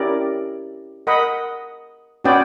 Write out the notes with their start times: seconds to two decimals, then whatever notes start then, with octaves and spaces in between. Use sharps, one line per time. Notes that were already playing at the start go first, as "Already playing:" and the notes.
Already playing: C#4 E4 G4 A#4 D5
1.07 A#4 D#5 F#5 B5
2.24 C#4 F#4 B4 D5 G5